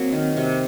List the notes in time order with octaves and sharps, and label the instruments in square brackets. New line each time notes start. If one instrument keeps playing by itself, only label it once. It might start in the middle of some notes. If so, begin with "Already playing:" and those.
Already playing: [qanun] F#3 A#3 [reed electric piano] C4
[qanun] D#3
C3